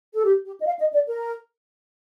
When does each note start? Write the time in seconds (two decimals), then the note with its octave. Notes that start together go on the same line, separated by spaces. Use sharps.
0.13 A4
0.24 G4
0.45 G4
0.61 D#5
0.66 F5
0.80 D#5
0.93 D5
1.07 A#4